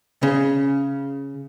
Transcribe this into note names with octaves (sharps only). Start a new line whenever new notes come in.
C#3